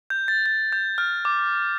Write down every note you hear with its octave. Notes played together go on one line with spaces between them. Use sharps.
G6
A6
A6
G6
F6
D6